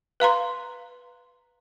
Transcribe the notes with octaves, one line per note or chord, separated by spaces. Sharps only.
B4 F5 A#5 C6